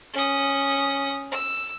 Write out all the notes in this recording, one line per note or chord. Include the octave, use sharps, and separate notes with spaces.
C#4 D#6
E6